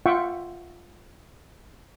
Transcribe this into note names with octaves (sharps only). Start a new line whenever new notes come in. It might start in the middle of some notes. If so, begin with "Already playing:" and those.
F4 E5 F#5 G5 C#6